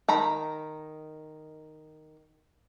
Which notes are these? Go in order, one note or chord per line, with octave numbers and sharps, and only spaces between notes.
D#3 A#5 B5